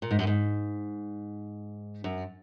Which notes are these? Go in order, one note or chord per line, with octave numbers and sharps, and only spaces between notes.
A#2
G#2
F#2
G#2
F#2